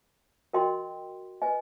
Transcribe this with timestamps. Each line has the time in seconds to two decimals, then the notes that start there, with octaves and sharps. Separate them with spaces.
0.53 F#4 A#4 D#5 G5 C6
1.42 B4 D#5 G#5